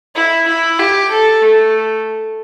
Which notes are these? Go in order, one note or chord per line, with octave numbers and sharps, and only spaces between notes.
E4
E4
G4
A4
A3